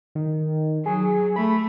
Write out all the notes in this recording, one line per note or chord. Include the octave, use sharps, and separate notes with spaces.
D#3
F#3 G#4
A3 B5